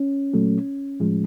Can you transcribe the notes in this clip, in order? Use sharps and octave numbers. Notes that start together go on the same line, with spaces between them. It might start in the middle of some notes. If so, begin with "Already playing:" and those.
Already playing: C#4
A#2 F#3 A3
A2 F3 G#3